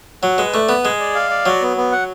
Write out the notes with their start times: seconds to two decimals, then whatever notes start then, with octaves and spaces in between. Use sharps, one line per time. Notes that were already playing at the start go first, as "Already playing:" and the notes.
0.23 F#3 F#5
0.38 G#3 B4
0.53 A3 D5
0.69 B3 B4
0.84 G#3 G#4
0.99 D5
1.15 F5
1.30 D5
1.46 F#3 F#4
1.62 B3
1.77 B3
1.92 F#5